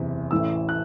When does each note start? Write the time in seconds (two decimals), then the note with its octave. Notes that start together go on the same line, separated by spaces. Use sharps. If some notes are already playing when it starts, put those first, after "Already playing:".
Already playing: F#1 E2 C3
0.31 A1 A2 E3 E6
0.69 F#6